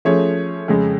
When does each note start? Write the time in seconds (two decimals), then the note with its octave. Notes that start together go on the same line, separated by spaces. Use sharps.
0.05 F3 A3 C#4 G#4 C#5
0.68 F2 C#3 G#3